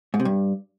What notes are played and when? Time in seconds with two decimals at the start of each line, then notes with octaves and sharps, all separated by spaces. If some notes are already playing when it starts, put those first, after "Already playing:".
0.14 G#2
0.20 C3
0.25 G2